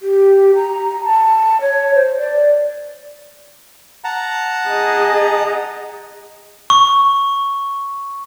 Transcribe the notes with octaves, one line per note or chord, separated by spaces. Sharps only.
G4
A#5
A5
C#5
C5
D5
F#5 A5 A#5
G#4 D#5
C#6